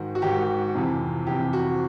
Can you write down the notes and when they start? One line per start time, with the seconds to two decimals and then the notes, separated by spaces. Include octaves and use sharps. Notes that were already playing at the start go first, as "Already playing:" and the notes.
Already playing: G#2 D#3 F#4
0.15 F#4
0.22 G#2 D#3 G4
0.74 F2 C3 E3
1.27 F2 C3 E3 G4
1.53 F#4